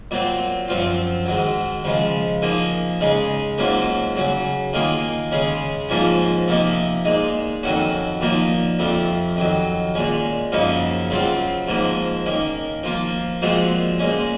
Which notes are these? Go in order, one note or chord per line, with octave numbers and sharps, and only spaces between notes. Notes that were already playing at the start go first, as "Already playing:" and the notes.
A#2 F#3 C4
F#2 F3 C4 F4
G#2 D#3 F#3
C#3 F3 G#3
F3 A#3 D#4 G#4
C#3 G#3 D#4 G#4
G#2 F#3 A#3 C#4 F4
C#3 F#3 C#4
D#3 A#3 F4 G#4
C#3 G#3 C#4 G#4
G#2 F3 A#3 C#4 F4
C3 F3 A#3 D#4
A#2 G#3 D#4
F2 D#3 F#3 C#4 F#4
A#2 F3 A#3 D#4
F2 C3 F3
F2 D#3 F#3
A#2 G#3 C#4
F#2 C#3 F3 A#3 D#4
C#3 F#3 C4 F4
G#2 F3 A#3
D#3 A#3 C#4
F3 A#3 F4
A#2 F3 G#3 C4 F#4
A#2 G#3 C#4